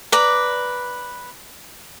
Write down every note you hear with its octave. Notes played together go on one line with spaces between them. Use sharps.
B4 D5 A#5